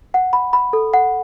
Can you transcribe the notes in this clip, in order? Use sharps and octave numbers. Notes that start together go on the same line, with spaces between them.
F#5
B5
B5
A4
F#5